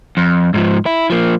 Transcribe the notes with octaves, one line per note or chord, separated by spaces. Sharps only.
F2
G#2 F3
E4
F3 A#3